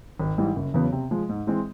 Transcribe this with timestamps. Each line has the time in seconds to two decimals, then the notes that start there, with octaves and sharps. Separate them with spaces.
0.20 G#1
0.38 G#2 E3 G3
0.56 F#1
0.74 E2 C#3 F#3 B3
0.92 C3
1.11 F3 G#3
1.29 G#2
1.47 E3 G#3 C4